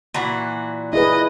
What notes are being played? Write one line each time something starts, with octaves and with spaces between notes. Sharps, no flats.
A#2 E3 F#4
E4 G#4 B4 D#5